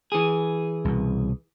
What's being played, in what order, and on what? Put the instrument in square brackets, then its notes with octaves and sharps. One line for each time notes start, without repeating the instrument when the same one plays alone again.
[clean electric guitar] E3 G#4
[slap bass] C2 B2